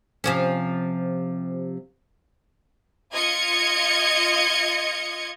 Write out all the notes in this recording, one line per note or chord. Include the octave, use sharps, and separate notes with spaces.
C3 F3 C#4
F4 D#5 G#6 C#7